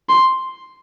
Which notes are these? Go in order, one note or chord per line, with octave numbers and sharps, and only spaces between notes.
C6